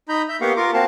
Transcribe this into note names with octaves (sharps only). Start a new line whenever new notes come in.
D#4 A#5 B5 G6
E5 G6
A#3 B3 G4 F5 F#5 C#6
F4 A#4 C6 D6
A#3 C4 F#4 F5 A5